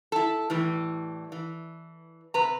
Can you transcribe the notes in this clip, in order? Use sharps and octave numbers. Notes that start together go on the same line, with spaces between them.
E4 A4
A2 E3 G3
E3
C3 B4 A#5